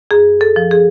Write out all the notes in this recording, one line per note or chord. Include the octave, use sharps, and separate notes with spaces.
F#2 G#4
A4
F3
G#4